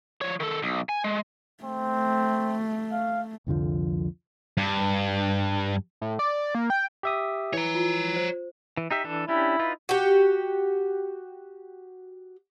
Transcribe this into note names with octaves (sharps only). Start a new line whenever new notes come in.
F3 C#5
D#3 A4
B1
G#5
G#3
A3 C4
F5
C2 F2 D3 F3
G2
A2
D5
A#3
G5
G4 E5 D#6
E3 C#5 A#5
F4
C5
E3
D#4 G4 E5
E3 D4 A4
C#4 D4 E4 G4
D#4 F4 B4
F#4 G4